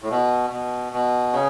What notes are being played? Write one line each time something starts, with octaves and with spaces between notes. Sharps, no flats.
A2
B2
B2
B2
C#3